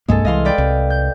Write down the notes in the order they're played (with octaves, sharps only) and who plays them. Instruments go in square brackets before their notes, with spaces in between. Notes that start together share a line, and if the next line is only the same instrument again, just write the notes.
[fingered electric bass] C2 G2 A#3 [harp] G#3 A4
[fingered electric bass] C2 E3 [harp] D#5 F5 C6
[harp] B4 D5 G5
[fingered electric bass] C2
[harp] G6